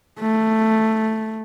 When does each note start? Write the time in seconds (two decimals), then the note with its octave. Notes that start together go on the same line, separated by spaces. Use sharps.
0.20 A3